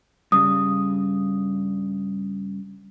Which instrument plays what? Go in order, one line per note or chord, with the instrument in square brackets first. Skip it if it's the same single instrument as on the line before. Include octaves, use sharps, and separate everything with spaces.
[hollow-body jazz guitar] G2 C#3 [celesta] D#6